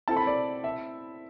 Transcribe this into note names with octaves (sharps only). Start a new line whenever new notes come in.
C4 E4 A4 A5
B5
D5
E5